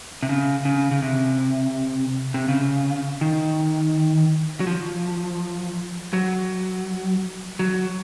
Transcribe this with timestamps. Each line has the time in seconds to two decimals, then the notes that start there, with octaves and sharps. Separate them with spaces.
0.23 C3
0.29 C#3
0.65 C#3
0.91 C#3
1.02 C3
2.34 C3
2.48 C#3
3.21 D#3
4.60 F#3
4.67 F3
6.13 F#3
7.59 F#3